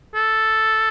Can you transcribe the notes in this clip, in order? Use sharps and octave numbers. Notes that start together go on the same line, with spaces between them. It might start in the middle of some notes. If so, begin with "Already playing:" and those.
A4